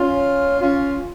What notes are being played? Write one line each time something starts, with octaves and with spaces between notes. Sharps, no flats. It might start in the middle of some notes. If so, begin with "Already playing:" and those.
Already playing: C#4 F4
C#4 F4